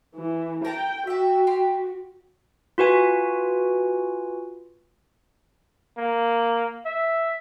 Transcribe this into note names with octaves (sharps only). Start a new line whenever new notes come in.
E3
A#4 G5 A5 A#5
F#4 G4 E5
G4 C6
F4 F#4 B4 G#5
A#3
E5